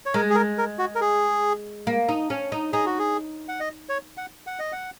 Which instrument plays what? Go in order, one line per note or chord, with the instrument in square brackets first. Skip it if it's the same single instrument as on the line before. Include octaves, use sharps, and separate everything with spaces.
[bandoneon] C#5
[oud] G#3 [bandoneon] A#4
[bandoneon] G#4
A#4
A#4
F#4
A#4
G#4
[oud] A#3
D#4
C#4
D#4
[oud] D#4 [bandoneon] G#4
[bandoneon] F#4
G#4
F#5
D#5
C#5
F#5
F#5
D#5
F#5